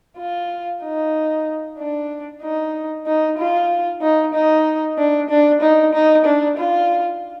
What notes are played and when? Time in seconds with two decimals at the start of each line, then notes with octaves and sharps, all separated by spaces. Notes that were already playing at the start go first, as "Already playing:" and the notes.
0.18 F4
0.82 D#4
1.78 D4
2.42 D#4
3.06 D#4
3.37 F4
4.02 D#4
4.33 D#4
4.98 D4
5.30 D4
5.61 D#4
5.93 D#4
6.25 D4
6.57 F4